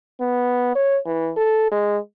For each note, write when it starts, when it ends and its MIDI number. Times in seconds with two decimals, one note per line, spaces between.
0.21 0.75 59
0.75 0.99 73
1.06 1.31 52
1.37 1.68 69
1.72 1.98 56